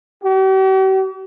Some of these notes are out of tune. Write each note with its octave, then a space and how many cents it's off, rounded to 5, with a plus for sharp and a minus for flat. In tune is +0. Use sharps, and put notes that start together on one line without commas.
G4 -45